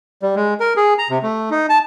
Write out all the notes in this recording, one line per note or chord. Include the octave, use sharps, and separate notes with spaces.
G3
G#3
A#4
G#4
A#5
C3
A3
D#4
A5